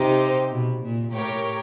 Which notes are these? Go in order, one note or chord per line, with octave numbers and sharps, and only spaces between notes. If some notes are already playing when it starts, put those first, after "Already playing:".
Already playing: C3 D#4 G4 C5
B2
A#2
A2 G4 A#4 C#5